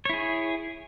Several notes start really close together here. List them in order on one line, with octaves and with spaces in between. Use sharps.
C#5 E4 G#4